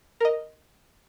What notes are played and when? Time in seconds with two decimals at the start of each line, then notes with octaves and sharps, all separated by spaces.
0.20 A#4 D#5